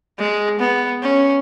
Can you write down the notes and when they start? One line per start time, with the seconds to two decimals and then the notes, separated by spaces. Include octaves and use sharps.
0.19 G#3
0.60 B3
1.02 C#4